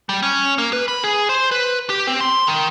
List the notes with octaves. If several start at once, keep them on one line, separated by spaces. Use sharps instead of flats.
G3
C#4
A#3
B4
B5
G#4
C5
B4
G4
C4
C6
D#3